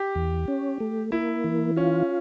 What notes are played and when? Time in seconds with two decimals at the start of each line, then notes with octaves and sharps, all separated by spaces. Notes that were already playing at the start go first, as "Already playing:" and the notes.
Already playing: G4
0.15 E2
0.48 C#4
0.80 A3
1.12 A#3 E4
1.44 E3
1.77 C#4 F4